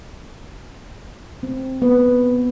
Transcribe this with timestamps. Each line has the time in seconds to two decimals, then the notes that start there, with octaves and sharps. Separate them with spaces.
1.43 C4
1.82 B3